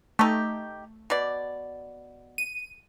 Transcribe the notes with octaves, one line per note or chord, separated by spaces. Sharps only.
A3 D#4 G4
B2 D5
D#7